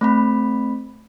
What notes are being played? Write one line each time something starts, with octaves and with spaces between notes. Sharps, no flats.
A3 C4 B5